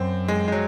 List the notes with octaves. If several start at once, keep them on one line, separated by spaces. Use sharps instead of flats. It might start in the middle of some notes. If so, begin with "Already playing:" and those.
Already playing: F#2 C4
G#3
G#3
F#3